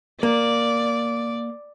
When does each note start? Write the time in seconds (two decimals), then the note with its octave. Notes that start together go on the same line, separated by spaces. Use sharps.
0.23 A#3 D5